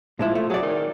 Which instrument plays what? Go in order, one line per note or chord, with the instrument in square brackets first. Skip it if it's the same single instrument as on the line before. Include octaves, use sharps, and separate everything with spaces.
[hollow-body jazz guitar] A#2 G#3 E4 [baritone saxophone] F3
[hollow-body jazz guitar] A3
[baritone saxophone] F#3 [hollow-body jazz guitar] G#4 D5
[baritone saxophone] D#3